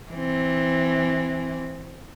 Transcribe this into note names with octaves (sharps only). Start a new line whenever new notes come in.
E3 C4